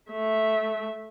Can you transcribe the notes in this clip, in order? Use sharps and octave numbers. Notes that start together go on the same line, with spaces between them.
A3 E5